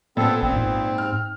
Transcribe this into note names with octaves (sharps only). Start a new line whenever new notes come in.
A#2 B3 C4 A4
A1 C4
G#2
F6